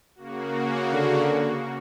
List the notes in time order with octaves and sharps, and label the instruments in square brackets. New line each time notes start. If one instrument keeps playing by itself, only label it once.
[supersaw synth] C#3 A#3 F#4
[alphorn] D3